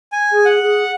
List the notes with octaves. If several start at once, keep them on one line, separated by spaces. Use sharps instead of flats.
G#5
G#4
F#5
G#4